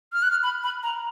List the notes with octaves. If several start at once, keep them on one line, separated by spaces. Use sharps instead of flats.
F6
F#6
F6
B5
B5
A#5